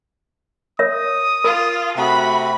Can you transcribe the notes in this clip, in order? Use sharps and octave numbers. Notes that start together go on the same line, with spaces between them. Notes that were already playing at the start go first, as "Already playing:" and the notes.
A#4 C#5 E5 D#6
F4 A#4
C3 A3 F#4 B5